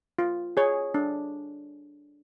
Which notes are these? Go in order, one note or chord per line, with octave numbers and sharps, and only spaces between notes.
F4
G#4 C#5
D4